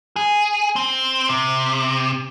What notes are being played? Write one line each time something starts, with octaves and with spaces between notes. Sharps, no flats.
G#4
C4
C3